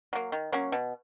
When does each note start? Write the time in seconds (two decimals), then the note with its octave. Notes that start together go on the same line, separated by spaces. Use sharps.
0.13 F#3 A#3
0.32 D#3
0.52 F#3 A#3 C#4
0.72 B2